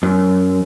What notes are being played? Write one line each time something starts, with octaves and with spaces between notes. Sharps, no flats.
F#2